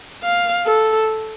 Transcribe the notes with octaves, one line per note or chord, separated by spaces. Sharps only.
F5
A4